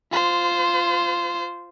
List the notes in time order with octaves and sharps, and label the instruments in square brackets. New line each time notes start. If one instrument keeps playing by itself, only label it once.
[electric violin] F4 C5